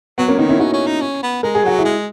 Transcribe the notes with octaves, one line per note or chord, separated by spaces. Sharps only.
F#3 B3
A#3 C#4
D#3 B3 D#4
C#4 E4
C#4 D#4 F#4
C#4
D#4
C#4
B3
G#3 A#4
G#4
F#3 F#4
E4 G#4
G#3